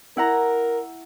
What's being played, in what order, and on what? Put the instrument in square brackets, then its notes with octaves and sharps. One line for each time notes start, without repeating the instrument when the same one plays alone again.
[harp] E4 F#5 A#5 [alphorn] A#4